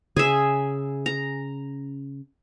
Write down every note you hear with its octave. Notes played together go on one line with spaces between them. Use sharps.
C#3 G#4 E5
A#5